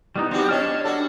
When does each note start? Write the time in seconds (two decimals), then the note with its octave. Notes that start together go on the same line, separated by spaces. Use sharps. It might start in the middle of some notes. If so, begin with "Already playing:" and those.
0.16 G3 B3 D#4 E4
0.31 G3 B3 C4 D#4 F#4 G4
0.49 C#4 D4 C#5 D#5 A5 F6
0.85 G3 F#4 A4 D5